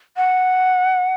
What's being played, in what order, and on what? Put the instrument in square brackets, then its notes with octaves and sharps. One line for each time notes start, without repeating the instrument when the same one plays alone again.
[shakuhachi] F#5